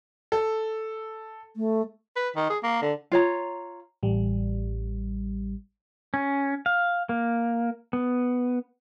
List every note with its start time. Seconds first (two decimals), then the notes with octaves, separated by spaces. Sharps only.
0.32 A4
1.56 A3
2.16 B4
2.36 D#3
2.50 G#4
2.63 A#3
2.82 D3
3.12 F4 C#5 A#5
4.03 A1 G3
6.14 C#4
6.66 F5
7.09 A#3
7.93 B3